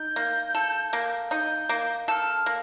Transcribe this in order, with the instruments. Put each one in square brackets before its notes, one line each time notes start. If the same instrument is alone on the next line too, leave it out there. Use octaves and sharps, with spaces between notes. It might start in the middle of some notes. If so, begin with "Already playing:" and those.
Already playing: [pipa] D#4 [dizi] G6
[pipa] A#3
A4
A#3
[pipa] D#4 [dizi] G6
[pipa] A#3
[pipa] A4 [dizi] F6 G6
[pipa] A#3